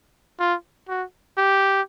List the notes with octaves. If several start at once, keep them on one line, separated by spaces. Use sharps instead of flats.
F4
F#4
G4